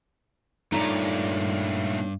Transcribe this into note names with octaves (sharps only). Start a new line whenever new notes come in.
G2 A#2 A3 D#4 C#5 D5